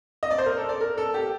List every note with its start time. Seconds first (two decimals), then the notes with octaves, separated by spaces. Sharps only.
0.23 D#5
0.31 D5
0.38 C5
0.46 A#4
0.58 A4
0.69 D5
0.81 A#4
0.98 A4
1.14 G4